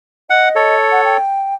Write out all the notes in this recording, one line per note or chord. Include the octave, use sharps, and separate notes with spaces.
D#5 F#5
A4 C#5
F#5
G5